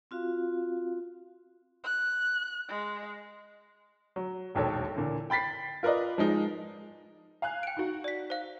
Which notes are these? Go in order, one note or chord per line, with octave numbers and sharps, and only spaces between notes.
C4 F4 F#4 F5
F#6
G#3
F#3
E1 A#1 D#2 A4 C#5
A#2 D3 E3
G5 B5 A6 B6 C7
F4 A#4 B4 D5 D#5
F3 G#3 D#4
F5 G#5 F#6
G5 D7
D#4 F#4
D5 B6
C5 F5